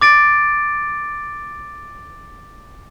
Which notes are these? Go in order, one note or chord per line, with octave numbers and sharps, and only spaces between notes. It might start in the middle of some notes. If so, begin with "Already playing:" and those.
D6 A6 D7